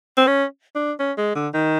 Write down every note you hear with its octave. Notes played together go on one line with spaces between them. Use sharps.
C4
C#4
D4
C#4
G#3
D3
D#3